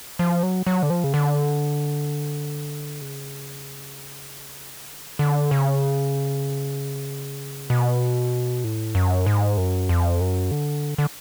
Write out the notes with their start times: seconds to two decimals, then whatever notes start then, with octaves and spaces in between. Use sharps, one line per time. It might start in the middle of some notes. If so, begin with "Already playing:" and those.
0.19 F3
0.43 F#3
0.66 F#3
0.83 D3
0.90 F3
1.04 C#3
1.14 D3
3.01 C#3
4.89 D3
5.19 D3
5.51 C#3
7.70 B2
8.64 A2
8.95 F#2
9.26 G#2
9.58 F#2
9.89 F2
10.21 F#2
10.51 D3
10.98 D3